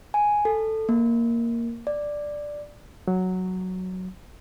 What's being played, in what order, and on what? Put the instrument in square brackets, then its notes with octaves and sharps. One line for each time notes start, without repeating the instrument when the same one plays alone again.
[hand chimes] G#5
A4
A#3
D5
[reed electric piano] F#3